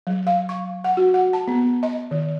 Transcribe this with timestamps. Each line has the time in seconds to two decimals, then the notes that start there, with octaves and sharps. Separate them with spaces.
0.07 F#3
0.27 F5
0.49 C#6
0.84 F#5
0.97 F#4
1.14 F#5
1.33 A5
1.48 B3
1.83 D#5
2.11 D#3